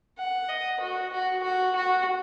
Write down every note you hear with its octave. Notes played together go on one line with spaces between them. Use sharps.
F#5
D#5
F#4
F#4
F#4
F#4